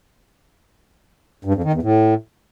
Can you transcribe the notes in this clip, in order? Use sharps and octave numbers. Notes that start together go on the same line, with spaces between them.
G2
F2
D#3
E2
A2